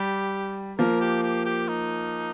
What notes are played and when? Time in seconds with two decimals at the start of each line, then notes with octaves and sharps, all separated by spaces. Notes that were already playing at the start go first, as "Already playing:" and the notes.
Already playing: G3 G4
0.78 F3 A#3 A#4
1.01 G4
1.23 G4
1.45 G4
1.68 D#4